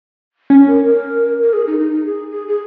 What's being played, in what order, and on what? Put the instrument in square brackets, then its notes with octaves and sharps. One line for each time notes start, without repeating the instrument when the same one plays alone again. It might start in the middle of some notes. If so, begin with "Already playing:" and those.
[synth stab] C#4
[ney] A#4
A#4
A#4
G#4
D#4
D#4
D#4
G#4
G#4
G#4